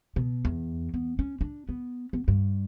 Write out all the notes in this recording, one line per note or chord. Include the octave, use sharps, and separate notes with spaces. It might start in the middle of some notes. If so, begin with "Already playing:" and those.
B2
E2
B3
C#4
D4
B3
B3
G2